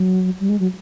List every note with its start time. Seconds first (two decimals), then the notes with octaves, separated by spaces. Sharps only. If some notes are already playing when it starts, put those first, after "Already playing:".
Already playing: F#3
0.40 G3
0.49 G#3
0.59 F#3